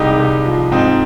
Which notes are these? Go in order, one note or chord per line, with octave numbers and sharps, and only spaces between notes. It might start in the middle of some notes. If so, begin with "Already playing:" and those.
Already playing: C2 G#3 D#4 G4
C2
F3
G#2 C4 D#4